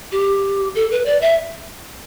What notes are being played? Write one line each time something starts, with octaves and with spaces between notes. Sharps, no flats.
G4
A4
B4
D5
E5